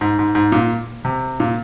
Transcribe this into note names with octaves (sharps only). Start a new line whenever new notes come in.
G#2
G#2
G#2
A#2
C3
A#2